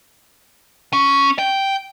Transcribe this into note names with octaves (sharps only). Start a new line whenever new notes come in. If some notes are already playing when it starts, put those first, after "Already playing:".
C#4
G5